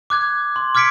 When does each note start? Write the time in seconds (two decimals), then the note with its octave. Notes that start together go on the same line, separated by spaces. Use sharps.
0.10 D6 F#6 G#6
0.56 C6
0.75 D6 F6 G#6 B6 C#7 D7